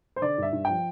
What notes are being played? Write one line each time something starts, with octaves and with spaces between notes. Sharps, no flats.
C5
D3 D5
G2 E5
G2
F3 G5